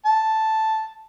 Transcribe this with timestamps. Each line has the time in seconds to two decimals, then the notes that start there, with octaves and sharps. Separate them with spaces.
0.06 A5